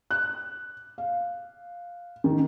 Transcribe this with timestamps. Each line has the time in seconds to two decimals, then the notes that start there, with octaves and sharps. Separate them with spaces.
0.11 F#6
0.98 F5
2.24 D#3